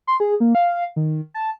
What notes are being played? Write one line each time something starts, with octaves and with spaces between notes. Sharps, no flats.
C6
G#4
A#3
F5
D#3
A5